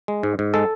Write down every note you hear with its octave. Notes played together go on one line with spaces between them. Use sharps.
G#3
G#2
G#2
G#3 A4